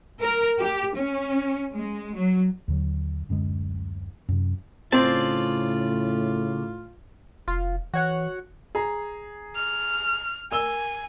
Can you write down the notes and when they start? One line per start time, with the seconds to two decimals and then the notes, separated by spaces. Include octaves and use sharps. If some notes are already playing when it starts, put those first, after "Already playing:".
0.20 A#4
0.60 G4
0.95 C#4
1.75 G#3
2.15 F#3
2.68 D#2 D3 F#3
3.29 D1 F#2 D3 G#3
4.29 F#2 C3
4.92 A2 C#3 C4 F4 D5 A5
7.48 F1 F4
7.94 E3 F#4 C#5 F#5
8.75 G#4 A#5
9.56 F6
10.52 A#4 G#5 E6 G7